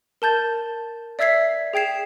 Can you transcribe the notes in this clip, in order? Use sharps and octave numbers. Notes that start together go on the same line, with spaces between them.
A#4 A5 G6 A6
D5 E5 E6 G#6 B6 C7
G#4 G5 G#6 C7 E7